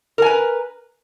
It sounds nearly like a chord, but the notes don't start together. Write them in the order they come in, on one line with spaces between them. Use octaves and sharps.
A#4 G#5 B4